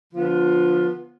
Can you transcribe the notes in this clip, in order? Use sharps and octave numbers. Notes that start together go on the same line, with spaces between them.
D3 F3 B3 F4